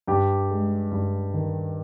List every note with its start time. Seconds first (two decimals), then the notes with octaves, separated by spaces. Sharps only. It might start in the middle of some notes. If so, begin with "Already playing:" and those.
0.08 G2 G4
0.50 G#3
0.91 G2
1.34 D#3